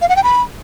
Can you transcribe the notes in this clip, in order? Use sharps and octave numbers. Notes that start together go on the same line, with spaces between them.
F5
F#5
G5
B5